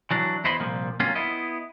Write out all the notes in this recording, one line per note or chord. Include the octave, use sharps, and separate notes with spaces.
E3 F#3 D4
E2 E4 C5 D#5 B5 C6
C2 A#2 F3
F#3 A#3 C4 C#4 F4
B3 E4 D#5